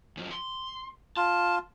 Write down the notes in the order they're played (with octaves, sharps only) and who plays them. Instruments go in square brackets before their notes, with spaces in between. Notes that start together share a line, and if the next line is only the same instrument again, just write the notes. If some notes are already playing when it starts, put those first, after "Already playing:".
[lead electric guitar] F#2 F3
C6
[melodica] F4 [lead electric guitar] A5